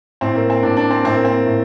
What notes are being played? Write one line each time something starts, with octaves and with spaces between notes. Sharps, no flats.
A2 C4
A#3
C4
A2 D4
D4
C4
A2 C4
A#3
C4
A2